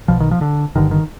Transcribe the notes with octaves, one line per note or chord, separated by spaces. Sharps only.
B1 B2 F3
D#3
F3
D3
G1 G2 D3 D#3
D#3